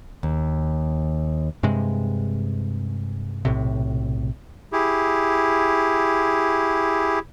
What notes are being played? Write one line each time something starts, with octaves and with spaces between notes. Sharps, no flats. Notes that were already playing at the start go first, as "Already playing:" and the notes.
D#2
G2 C3 G#3
B1 A2 C3
E4 G4 G#4